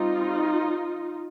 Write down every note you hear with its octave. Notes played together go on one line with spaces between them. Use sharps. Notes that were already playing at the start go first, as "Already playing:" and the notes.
Already playing: G3 C4 D#4 F4